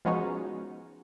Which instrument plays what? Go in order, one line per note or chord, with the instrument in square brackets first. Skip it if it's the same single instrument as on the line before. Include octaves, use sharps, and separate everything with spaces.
[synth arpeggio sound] F3 G#3 B3 C#4 D#4 F#4